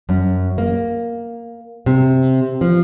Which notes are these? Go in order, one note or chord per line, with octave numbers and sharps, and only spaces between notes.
F#2
A#3
C3
F3